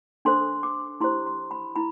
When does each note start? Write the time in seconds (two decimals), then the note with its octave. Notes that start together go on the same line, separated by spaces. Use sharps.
0.25 D4 A4 C5 C6
0.63 D6
1.01 E4 G4 C5 C6
1.26 C6
1.51 B5
1.76 E4 B5